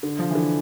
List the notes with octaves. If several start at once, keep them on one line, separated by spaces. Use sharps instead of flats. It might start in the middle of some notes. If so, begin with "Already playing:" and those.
D3
F3
E3
D3